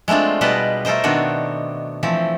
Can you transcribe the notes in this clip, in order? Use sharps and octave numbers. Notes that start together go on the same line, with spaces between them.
G#3 A3 C4 D4 F4
B2 G3 G#3 B4 D#5 A5
A3 A4 A#4 C5 D#5
B2 D#3 B3 C4 D4 F#4
E3 F3 A3 C4